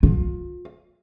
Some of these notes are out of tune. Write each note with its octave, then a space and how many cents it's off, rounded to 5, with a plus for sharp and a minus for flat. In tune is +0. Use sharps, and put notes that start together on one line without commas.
F4 +30